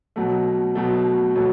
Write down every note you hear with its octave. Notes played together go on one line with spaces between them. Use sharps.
B2 F#3 A3
B2 F#3 A3
B2 F#3 A3